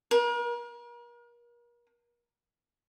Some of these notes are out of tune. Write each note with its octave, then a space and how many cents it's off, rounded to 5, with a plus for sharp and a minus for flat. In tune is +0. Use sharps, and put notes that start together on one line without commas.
A#4 +40